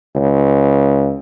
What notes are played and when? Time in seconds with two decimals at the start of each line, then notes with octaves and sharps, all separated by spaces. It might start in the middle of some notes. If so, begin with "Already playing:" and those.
0.15 C#2